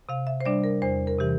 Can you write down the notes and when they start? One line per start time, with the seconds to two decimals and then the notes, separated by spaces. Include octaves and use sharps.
0.09 C3 F5
0.27 E5
0.41 C5
0.45 G3 D4 D5
0.64 A#4
0.82 E2 C5
1.07 A#4
1.19 C3 E3 G4